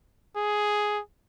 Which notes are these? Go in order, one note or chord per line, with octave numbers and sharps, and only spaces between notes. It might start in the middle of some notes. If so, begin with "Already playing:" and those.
G#4